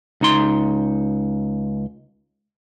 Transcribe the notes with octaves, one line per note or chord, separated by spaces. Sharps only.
C#2 D#4 C6